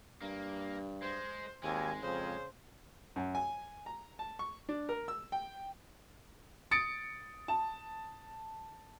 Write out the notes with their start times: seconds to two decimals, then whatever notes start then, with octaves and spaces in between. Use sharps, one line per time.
0.22 G2 A#3
1.02 G#3 C5
1.63 G#1 D#2 G#3 G#5
2.02 F2 C#3 C5
3.16 F#2
3.35 G#5
3.86 A#5
4.19 A5
4.39 C#6
4.69 D4
4.89 A#4
5.08 E6
5.32 G5
6.71 D#6 A6 C#7 D7
7.48 A5